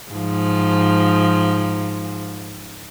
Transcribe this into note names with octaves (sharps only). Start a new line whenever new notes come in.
G#2 F3